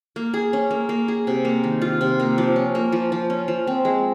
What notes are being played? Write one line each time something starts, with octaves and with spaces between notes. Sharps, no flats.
A#3
G#4
C#4
A#3
A#3
G#4
C3
A#3
D#3
F4
C3
A#3
F3
C#4
A#3
F3
F3
C#4
F3
C4
G#3